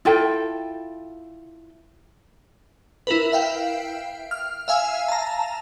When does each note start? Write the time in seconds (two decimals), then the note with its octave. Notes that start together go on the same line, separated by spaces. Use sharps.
0.05 E4 F4 A4 G5
3.07 E4 A#4 B4
3.32 E5 F5 G5
4.31 F6
4.68 E5 F5 G#5 E6
5.08 A5 A#5